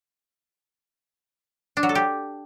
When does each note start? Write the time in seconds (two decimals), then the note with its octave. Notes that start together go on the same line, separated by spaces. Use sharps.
1.77 D4
1.83 F#3
1.89 A4
1.95 G4